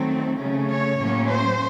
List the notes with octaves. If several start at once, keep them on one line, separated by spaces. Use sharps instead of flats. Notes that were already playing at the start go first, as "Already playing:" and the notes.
Already playing: D#3 F#3 A3 C4
C#3 A3 C#4
C#5
A2 F#3 A#3 C#4
C5